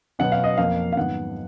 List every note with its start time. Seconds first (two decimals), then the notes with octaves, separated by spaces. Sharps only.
0.19 B2 F#3 B3 F#5
0.32 F5
0.44 D#5
0.57 F2 F3 A#3 F5
0.92 F5
0.96 G#2 D#3 F#3 B3 F#5